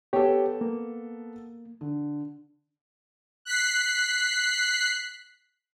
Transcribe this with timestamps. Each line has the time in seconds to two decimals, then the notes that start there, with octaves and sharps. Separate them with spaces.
0.13 B3 G4 A4 C#5 G5
0.61 A#3
1.81 D3
3.45 F#6 B6 C7